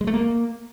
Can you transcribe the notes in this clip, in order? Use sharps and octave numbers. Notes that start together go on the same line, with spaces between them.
G#3
A3
A#3